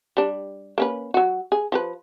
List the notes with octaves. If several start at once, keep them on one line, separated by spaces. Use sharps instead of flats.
G3 D4
A#3 C#4 B4
F#3 F#4
G#4
F3 G4 B4